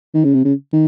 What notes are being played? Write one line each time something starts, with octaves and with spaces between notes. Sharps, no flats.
D#3
C#3
C3
C#3
D#3